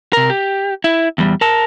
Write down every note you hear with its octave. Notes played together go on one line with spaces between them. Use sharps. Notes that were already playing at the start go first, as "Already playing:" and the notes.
C3 A#4
G4
E4
E2 G3
A#4 A5